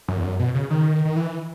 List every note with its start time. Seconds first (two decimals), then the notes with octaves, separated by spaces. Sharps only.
0.08 F#2
0.17 E2
0.24 F#2
0.39 B2
0.55 C#3
0.70 D#3
1.05 D#3
1.16 E3